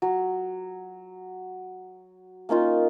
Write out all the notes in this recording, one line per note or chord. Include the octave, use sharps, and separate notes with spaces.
F#3
A#3 C#4 D#4 F4